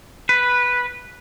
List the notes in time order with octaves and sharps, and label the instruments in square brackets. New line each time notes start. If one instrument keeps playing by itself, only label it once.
[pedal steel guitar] B4